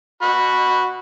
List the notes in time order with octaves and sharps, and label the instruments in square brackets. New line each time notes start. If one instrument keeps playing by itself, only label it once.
[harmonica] F#4 B5